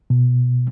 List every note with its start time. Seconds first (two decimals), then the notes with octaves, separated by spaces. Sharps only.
0.10 B2